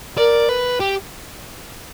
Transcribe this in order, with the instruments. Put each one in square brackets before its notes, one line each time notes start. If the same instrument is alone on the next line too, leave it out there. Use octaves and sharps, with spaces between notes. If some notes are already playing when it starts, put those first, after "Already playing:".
[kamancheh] A#4 [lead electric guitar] D5
[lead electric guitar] B4
G4